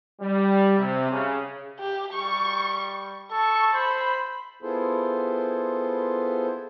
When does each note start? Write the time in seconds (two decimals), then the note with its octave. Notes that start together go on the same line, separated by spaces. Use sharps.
0.20 G3
0.78 C3
1.11 C#3
1.80 G4
2.13 G3 C#6
3.32 A4 C#6
3.74 C5 B5
4.62 B3 E4 F4 G#4 A4 C5